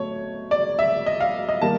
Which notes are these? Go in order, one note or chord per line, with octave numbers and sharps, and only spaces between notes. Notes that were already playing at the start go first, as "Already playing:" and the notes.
Already playing: B2 F#3 A3 C#5
D5
E5
D#5
F5
D#5
D#3 G3 A#3 A5